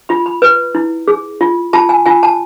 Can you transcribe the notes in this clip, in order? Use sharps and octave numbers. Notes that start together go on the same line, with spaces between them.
F4 B5
B5
B4
E4
G#4
F4
F4 A5
G#5
F4 G#5
A5